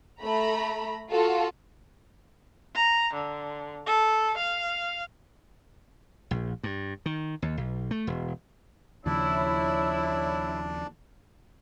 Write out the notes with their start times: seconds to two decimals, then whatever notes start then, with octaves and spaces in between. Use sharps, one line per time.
0.21 A3 A#5 B5
1.10 F4 F#4 A4
2.75 A#5
3.14 D3
3.86 A4
4.38 F5
6.31 A#1
6.63 G2
7.06 D#3
7.42 D#2
7.57 B1
7.91 A3
8.07 E1
9.06 D#2 C#3 F3 D4 E4 C#5 D5